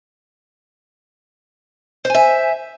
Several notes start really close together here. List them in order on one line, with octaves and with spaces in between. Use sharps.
C5 G#5 E5